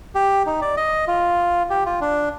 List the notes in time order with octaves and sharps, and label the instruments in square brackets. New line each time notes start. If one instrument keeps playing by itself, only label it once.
[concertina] G4
D#4
D5
D#5
F4
G4
F4
D4